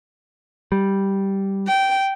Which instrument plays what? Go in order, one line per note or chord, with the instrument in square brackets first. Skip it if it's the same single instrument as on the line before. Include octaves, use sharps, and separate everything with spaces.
[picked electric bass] G3
[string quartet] G5